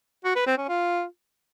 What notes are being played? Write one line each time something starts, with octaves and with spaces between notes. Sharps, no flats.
F#4
B4
C4
C#4
F4